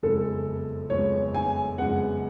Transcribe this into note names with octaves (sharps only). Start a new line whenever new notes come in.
F#1 F2 C#3 G#3 B3 A4
F#1 F2 C#3 G#3 B3 C#5
G#5
F#1 F2 C#3 G#3 B3 F#5